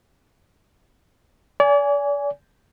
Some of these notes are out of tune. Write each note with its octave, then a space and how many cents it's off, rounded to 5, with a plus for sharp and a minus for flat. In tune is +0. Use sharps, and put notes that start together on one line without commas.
D5 -40 G#5 +0